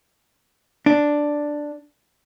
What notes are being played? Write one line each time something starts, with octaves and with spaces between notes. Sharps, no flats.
D4